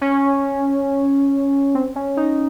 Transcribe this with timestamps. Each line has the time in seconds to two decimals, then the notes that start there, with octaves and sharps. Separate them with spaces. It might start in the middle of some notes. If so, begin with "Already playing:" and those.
0.01 C#4
1.75 C4
1.96 C#4
2.17 D#4